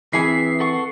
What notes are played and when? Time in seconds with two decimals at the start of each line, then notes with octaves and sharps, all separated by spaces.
0.13 E3 C4 G#4 B4 E5 C7 C#7
0.60 A4 F#5 C#6